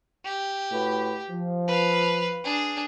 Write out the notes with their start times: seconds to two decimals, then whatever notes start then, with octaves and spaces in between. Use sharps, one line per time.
0.25 G4
0.71 A2 F#4 B4
1.30 F3
1.68 B4 F5
2.44 D4 G#4